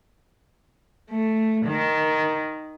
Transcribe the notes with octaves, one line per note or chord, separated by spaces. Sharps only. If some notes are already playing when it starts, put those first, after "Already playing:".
A3
D#3